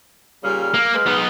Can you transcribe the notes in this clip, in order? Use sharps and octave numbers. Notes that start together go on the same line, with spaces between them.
A#2 C#3 G3 F6
F6
A#3
G#3 B4
B3 D#4